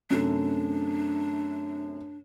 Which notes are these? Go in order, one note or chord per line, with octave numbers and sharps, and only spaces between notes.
F#2 C3 A3 D4